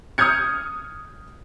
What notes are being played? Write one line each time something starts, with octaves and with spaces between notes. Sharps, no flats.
D#6 F6 G6 G#6 C#7